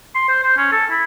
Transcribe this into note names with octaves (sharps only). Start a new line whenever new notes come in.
C6
C5
C5
C#4
A4
E4